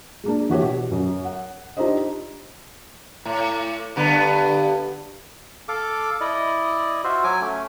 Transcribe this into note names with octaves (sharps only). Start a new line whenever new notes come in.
G#3 A#3 D4
E3 F#4 G4 C#5
B2 C#5
F#2
F#5
D4 D#4 F4 G4 C5 D#5
A2
G2 D3 B3
A4 F5 D6
E4 D5 D#5
F4 F#4 C5 E5
F#3 C#5 G#5 D6
A3 C#4